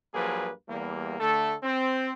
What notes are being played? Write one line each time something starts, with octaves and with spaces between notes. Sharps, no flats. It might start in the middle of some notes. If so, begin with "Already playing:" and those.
G2 F3 F#3 A#3 G#4 B4
E2 G3 A#3
D3 A3 A4
C4